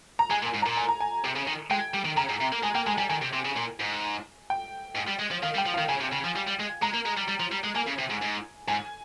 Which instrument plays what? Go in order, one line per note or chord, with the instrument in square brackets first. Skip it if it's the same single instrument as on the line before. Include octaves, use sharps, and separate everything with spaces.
[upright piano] A#5
[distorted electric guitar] G#3 [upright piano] G#5
[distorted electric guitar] A#2
[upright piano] G#5
[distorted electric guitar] G#2
[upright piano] A#5
[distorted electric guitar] A#2
[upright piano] G#5
A#5
G#5
[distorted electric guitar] C3
C#3
D#3
[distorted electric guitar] G#3 [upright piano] G5
[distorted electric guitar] G3
D#3
[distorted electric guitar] C#3 [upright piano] A#5
[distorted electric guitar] G#2
C3
A#3
[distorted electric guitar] G#3 [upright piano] G#5
[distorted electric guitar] A#3 [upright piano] G5
[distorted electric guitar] G#3 [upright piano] G#5
[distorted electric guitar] G3 [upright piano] G#5
[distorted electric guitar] D#3 [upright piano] G#5
[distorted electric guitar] C3
C3
C#3
A#2
G#2
[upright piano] G5
[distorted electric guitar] G#2
G3
G#3
F3
[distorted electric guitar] D#3 [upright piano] F5
[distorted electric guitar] G3
[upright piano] G5
[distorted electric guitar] F3
[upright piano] F5
[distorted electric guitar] D#3
[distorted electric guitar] C#3 [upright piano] G#5
[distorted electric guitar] C3
C#3
F3
G3
G3
G#3
[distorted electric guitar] G#3 [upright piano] A#5
[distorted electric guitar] A#3
G#3
G3
G3
F3
G3
G#3
[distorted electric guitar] A#3 [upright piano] G#5
[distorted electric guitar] C#3
C3
G#2
G#2
[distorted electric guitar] G#2 [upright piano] G#5